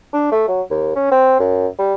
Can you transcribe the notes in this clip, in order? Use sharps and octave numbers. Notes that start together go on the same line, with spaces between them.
D4
A3
F#3
D#2
C#4
C4
F#2
G3